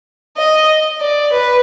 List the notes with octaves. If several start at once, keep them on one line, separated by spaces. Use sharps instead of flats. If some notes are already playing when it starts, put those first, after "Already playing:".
D#5
D5
B4